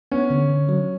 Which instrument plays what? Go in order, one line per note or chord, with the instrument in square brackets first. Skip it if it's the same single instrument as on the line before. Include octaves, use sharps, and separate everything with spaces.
[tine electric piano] B3 [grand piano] C#4
[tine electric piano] D3
D3
F#3